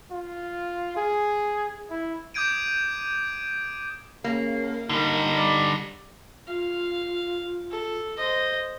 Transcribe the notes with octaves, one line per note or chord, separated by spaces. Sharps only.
F4
G#4
E4
D6 D#6 G6 G#6 D7 D#7
C#3 A#3
D3 G3 D#4
D5
F4 F5
A4
C5 D#5